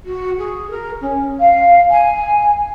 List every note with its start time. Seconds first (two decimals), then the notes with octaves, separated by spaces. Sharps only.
0.05 F#4
0.38 G#4
0.70 A#4
1.00 C#4
1.39 F5
1.90 G#5